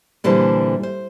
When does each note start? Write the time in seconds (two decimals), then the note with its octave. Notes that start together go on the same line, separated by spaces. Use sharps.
0.24 A#2 D3 E3 G3 C5 A5
0.83 C5